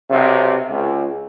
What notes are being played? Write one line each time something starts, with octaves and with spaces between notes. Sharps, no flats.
B1 C3
C#2